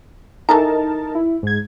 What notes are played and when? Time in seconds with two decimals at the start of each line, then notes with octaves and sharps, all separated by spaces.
0.49 E3 D#4 A4 A#4 A5 A#5
1.15 E4
1.43 G#2 G#6